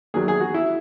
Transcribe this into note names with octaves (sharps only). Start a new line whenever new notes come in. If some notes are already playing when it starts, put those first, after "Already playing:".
E2 D#3 F#3 G#4
G#4
F#4
E4